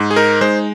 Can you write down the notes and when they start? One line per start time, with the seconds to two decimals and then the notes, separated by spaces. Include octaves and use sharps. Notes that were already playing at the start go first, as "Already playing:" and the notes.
Already playing: G#2
0.11 G#4
0.16 D#4 A#4
0.41 G#3 C5